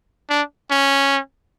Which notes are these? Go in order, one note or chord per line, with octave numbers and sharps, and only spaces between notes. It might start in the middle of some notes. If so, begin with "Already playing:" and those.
D4
C#4